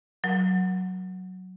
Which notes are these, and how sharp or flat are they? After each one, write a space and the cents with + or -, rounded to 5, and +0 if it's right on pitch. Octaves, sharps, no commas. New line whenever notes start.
F#3 +0 A#4 +30